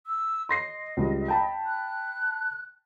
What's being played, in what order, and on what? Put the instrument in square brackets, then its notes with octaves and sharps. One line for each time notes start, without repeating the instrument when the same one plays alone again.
[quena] E6
[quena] D#5 [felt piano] C6 A#6 C7
[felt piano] C#2 G3
G5 A5 B5
[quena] F#6